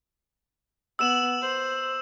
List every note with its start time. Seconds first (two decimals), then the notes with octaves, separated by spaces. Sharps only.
0.99 B3 E6 E7 F#7
1.41 C5